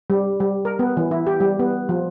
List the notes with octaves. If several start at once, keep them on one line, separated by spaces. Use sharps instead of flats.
G3
G3
A#4
B3
E3
E4
G4
G3
B3
F3